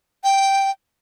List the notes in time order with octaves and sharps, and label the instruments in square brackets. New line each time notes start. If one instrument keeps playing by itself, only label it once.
[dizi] G5